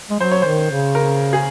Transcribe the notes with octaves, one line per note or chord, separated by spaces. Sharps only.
G#3
F#3 C5
C#5
D#3 C5
C#3
A#4
G#4